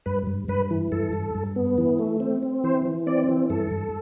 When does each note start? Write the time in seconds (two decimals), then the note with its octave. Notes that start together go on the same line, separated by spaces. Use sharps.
0.06 G2 B4
0.27 G2
0.48 G2 B4
0.70 E3
0.92 G2 A4
1.13 G2
1.35 G2
1.56 B3
1.78 E3
1.99 A3
2.20 C4
2.43 C4
2.64 E3 C5
2.85 E3
3.07 C4 D5
3.29 E3
3.50 G2 A4
3.71 G2